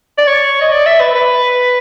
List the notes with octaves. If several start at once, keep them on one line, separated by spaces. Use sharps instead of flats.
D5
C#5
D#5
D5
E5
B4
B4